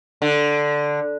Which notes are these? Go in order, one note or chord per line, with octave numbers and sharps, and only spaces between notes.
D3